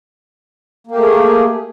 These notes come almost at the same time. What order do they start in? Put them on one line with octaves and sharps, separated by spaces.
A#3 G4 A3 G#4